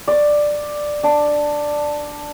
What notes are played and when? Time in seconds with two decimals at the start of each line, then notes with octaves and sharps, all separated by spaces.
0.08 D5
1.03 D4